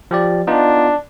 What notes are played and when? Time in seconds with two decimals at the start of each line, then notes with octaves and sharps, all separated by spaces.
0.11 F3 G4 D5
0.47 B3 D4 D#4 F4